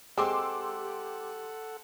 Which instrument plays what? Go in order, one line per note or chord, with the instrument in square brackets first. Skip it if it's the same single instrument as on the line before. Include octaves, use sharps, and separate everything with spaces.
[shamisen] G#3 C4 [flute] G4 [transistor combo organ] A4 F#5 [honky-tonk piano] C6 D6 E6